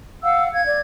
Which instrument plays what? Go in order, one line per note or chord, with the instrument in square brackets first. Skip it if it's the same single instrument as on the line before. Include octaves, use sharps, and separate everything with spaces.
[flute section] F5 F#5 [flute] E6
[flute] F5 [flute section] G#6
[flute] D5